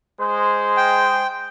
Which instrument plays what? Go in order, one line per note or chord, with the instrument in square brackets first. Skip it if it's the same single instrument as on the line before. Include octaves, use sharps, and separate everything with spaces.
[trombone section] G#3 C5
[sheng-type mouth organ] G5